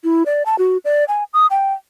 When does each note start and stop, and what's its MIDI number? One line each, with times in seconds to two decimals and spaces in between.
0.04 0.23 64
0.26 0.43 74
0.46 0.58 81
0.58 0.77 66
0.85 1.05 74
1.08 1.24 80
1.34 1.47 87
1.50 1.73 79